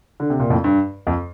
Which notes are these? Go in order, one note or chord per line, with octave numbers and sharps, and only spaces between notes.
D3
C3
A#2
F2 A2
G2
F2